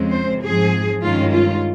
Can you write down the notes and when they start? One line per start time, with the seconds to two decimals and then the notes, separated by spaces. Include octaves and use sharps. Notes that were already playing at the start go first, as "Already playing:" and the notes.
Already playing: F2 C#3 G#3 C4
0.11 C5
0.42 G#2 F3 C4 G#4
1.02 G2 D#3 G#3 C#4 F4
1.33 F4